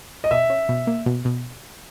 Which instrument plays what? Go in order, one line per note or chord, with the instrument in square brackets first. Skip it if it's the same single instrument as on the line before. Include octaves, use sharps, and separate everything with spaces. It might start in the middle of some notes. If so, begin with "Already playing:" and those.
[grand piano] D#5
[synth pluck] B2 [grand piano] E5
[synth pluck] C#4
B2
A#3
B2
B2